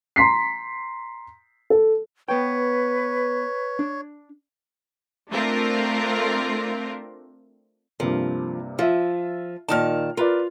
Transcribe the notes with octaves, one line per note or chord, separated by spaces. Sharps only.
A#5 C6 B6 C7
A4
B3 B4 C#5 G5
D4
A3 C4 D4 F4 A#4
G2 C3 F3 A#3
F3 F4 E5
A#2 D#3 D#4 A5 F6
F4 A#4 B4 D5